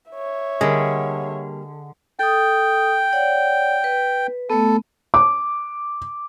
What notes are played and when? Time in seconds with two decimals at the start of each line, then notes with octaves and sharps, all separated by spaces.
0.11 C#5 E5
0.61 D3 G3 A#3 G#4 D#5
2.19 A4 G5 D#6
3.13 C#5 D5 F#5
3.84 B4
4.50 A3 B3 A4
5.14 D6